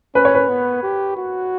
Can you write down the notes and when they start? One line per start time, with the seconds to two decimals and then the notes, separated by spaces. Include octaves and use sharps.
0.15 C#4 B4
0.25 C#5
0.35 B4
0.48 B3
0.83 G4
1.17 F#4